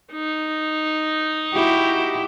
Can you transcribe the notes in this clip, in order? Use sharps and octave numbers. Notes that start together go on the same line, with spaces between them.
D#4
E4 F#4 G4